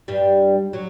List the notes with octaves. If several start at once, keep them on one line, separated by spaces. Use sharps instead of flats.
G2 G3
F#3